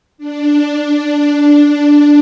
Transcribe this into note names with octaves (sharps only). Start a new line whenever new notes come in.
D4
D4